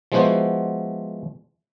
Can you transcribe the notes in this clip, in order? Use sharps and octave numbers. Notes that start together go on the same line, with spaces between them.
F3 G#3 B3 E4 F#4 C5